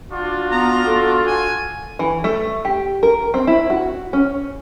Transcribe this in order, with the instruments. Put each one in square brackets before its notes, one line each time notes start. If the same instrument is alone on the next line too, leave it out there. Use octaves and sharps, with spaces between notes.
[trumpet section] D4 F4 F#4
[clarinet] B3 [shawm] A#5
[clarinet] A4
[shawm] G#5
[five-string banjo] E3
A3
G4
A#4
C4
E4
F#4
C#4